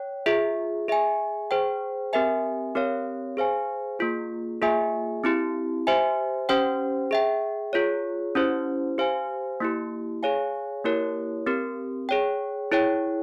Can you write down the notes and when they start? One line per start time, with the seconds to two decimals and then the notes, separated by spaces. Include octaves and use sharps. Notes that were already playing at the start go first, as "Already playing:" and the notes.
Already playing: C#5 G5
0.26 F4 G#4 E5
0.88 G#4 E5 G#5
1.51 G#4 C5 G5
2.13 C4 G4 A#4 E5 G#5
2.75 C4 G4 A#4 C#5 F5
3.37 G#4 C5 F5 G#5
3.99 A#3 F4 G#4
4.62 A#3 F4 G#4 E5 G#5
5.24 C4 E4 G4
5.87 G4 C5 E5 G#5
6.49 C#4 G4 C5 G5
7.11 G#4 E5 G5
7.73 F4 G#4 C#5
8.35 C#4 E4 G4 C5
8.98 G4 C5 F5 G#5
9.60 A#3 E4 G4
10.23 G#4 C#5 F5 G#5
10.84 A#3 E4 G4 A#4 C#5
11.46 C4 G4 A#4
12.09 G#4 C#5 G5
12.72 E4 G#4 C#5 G5